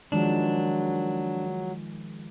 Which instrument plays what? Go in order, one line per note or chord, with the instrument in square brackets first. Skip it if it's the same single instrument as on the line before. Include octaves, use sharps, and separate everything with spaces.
[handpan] D#3 F3 G#3 [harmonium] F#3 [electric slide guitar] D4